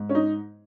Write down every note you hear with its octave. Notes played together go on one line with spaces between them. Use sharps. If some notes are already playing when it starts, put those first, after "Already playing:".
Already playing: G#2
C#4
D#4